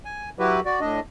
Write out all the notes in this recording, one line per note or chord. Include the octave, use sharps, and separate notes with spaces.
G#5
F#3 E4 F#4 G4 B4
F#4 D5
A2 D4 D#5